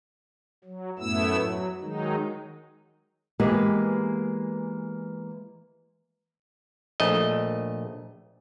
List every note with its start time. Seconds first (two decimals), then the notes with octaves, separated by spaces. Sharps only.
0.65 F#3
0.99 F#2 A2 A3 B3 E4 E6
1.39 F#3
1.81 D#3 F#3 G#3 D#4
3.40 E3 G#3 A#3 B3 G4 B4
7.00 A#1 A3 D#5